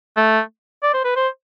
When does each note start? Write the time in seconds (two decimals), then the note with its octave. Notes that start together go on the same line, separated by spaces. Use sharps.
0.17 A3
0.83 D5
0.94 C5
1.04 B4
1.16 C5